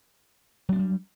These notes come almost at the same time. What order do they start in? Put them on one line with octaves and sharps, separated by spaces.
F#3 D4 B3 G3